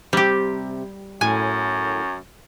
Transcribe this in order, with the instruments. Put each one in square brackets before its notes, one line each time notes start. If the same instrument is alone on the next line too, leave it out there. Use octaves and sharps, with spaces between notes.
[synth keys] C3 [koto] G3 G4
[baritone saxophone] F#2 [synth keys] A2 [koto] G#5